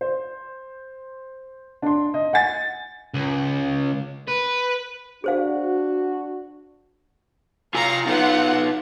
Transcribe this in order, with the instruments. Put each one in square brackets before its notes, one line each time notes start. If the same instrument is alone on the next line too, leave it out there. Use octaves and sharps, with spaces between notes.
[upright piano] C5
D4 C6
D#5
F#5 G#5 A6
[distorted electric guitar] C#2
B4
[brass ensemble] D4 F#4 [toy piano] G#4 C5 F5
[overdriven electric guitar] F4 G#5 [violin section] F5 A#5
[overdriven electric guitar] B3 D#4 [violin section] F4 F#5